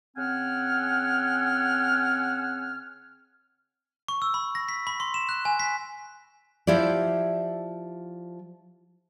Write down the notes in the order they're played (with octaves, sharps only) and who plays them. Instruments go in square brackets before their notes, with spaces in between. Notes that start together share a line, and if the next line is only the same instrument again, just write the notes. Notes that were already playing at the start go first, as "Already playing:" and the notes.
[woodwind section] C#3 C4 F#5 G#5 F6
[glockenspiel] C#6
E6
B5
A#6
B6
B5
C6
E7
F#6
G#5
B6
[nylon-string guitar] F3 E4 G4 D5